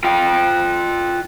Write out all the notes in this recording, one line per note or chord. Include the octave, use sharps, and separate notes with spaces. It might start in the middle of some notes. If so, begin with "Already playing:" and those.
F4 G5